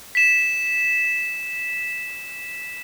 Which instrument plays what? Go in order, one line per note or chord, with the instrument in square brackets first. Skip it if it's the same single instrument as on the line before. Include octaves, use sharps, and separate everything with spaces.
[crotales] B6 E7